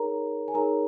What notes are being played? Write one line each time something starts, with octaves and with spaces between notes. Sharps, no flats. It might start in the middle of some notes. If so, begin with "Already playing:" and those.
Already playing: D#4 G#4 A#4 C#5 A#5
G#5
D#4 G#4 A#4 C#5 A#5